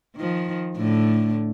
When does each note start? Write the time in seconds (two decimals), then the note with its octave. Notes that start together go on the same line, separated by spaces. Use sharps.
0.16 D#3 F3
0.77 A2 D3 A3